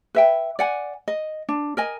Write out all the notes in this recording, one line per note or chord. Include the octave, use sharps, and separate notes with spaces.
B4 E5 G5
D5 F#5 G#5
D#5
D4
A#4 D#5 G#5